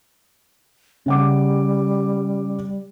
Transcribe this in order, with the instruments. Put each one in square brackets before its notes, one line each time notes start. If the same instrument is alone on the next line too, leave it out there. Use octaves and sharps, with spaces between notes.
[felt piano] C#3 F#5 D6 [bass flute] G3